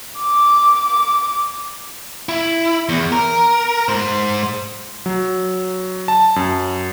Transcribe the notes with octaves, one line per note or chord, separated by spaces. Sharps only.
D6
E4
E2
A#4
G#2 C5
F#3
A5
F#2